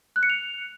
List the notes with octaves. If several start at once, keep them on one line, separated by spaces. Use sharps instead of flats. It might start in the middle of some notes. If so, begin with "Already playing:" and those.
F#6
C#7
F7